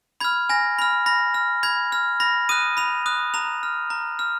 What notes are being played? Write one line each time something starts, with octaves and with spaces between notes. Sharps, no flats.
B5 F6 G#6
G#5 A#6
B5 F6
B5 A#6
F6
B5 G#6
F6
B5 A#6
D#6 F#6 D#7
B5 F7
D#6 F#6
A#5 F7
F6
A#5
F6